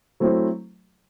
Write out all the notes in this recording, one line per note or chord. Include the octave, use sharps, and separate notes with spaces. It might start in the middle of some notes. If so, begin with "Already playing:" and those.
F#3 A3 C4 E4